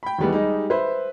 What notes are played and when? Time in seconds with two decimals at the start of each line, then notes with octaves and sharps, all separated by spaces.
0.03 G5 B5
0.19 D#2 D#3 E3 G3 G#3 B3
0.31 G3 G#3 D#4 G4
0.70 B4 C5 E5